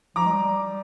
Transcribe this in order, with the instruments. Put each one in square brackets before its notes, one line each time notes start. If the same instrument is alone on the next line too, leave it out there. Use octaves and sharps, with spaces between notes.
[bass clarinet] F3 [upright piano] A#5 D6
[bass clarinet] G#3
G3